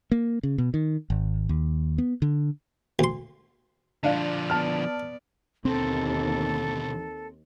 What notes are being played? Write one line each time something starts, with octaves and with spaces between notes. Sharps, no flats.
A#3
C#3
B2
D#3
G#1
D#2
B3
D3
D2 C6
D3 F3 D4 D5 F5
B3 D5 A5 F6
D#2 B2 D3 C4 A4